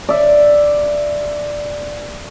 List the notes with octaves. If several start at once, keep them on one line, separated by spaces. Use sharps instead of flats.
D5 E5